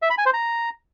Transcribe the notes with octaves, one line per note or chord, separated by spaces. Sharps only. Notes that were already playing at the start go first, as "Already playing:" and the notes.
E5
B5
G#5
C5
A#5